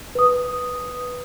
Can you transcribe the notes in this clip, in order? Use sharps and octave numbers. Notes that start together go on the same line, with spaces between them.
B4 D#6